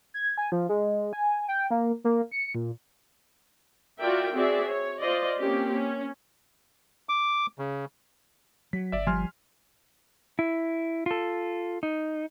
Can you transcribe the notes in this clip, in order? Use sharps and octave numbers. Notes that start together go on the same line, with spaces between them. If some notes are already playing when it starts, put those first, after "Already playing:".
G#6
G#5
F3
G#3
G#5
G5
A#3
A#3
C#7
A#2
F4 F#4 A#4 D5 E5 G5
C4 F#4 G#4 D5 E5
C#5
F4 C5 D5 D#5
A#3 C4 C#4 G4
C#4
D6
C#3
F#3 B6
G1 D5 E5
F3 G3 G#5 C6 F6
E4
F4 A4
D#4